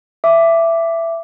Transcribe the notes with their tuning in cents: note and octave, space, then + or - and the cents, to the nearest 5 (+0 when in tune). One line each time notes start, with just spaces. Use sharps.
E5 +15 D6 +0